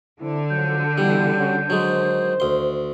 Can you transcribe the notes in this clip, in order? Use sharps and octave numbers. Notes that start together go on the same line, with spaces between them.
D3 C4 E4
G#2 F3 F#3 G6
B2 E3 G3
C#4 F#4
D#3 F#3 G#3 C5
D2 C6